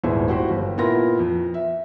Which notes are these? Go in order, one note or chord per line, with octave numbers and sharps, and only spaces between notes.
D#1 G#1 B3 E4 G#4 C5
E4 F#4 G4 C5
G1
A#2 B3 E4 F4 A#4 A#6
F2
E5